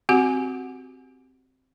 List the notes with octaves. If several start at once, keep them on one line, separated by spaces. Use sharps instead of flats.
C4 F#4 G4 F#5